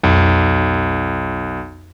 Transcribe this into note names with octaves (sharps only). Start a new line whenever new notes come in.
B1 F2